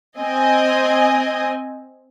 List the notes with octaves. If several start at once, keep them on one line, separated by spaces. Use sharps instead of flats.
C4 D#5 G#5